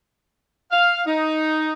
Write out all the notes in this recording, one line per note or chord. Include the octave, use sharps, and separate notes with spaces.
F5
D#4